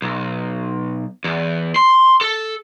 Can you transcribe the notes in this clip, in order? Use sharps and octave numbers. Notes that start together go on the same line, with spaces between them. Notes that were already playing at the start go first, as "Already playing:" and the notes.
B1
E2
C6
A4